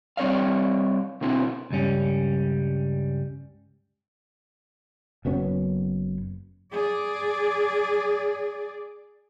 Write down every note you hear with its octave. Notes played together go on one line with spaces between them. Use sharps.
G3 C4 C#5 D5 F5
B2 D3 C4 E4 F#4
C#2 G2 G3 C#4
F#1 F#2 B3 C#4
G#4 D5